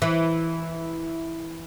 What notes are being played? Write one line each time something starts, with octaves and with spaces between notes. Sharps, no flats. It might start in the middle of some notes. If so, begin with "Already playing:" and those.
E3